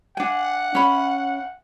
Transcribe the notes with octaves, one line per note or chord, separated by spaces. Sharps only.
D4 F#5 G#5
C#4 B5